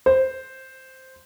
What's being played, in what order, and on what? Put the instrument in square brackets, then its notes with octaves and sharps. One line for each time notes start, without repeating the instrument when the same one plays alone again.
[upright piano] C5